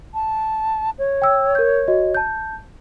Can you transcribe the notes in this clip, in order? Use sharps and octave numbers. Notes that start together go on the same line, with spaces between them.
A5
C#5
G5 E6
A#4 G6
F#4 D#5
A5 G6